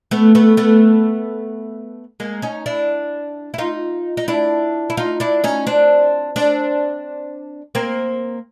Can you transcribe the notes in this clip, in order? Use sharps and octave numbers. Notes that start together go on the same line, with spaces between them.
A3 B3
A3 B3
A3 B3
G#3 A#3
C#4 D#4
D4 E4
E4
D#4 F4
D#4
D4 E4
E4
D#4 F4
D4 E4
C#4 D#4
C4 D4
C4 D4
A#3 C4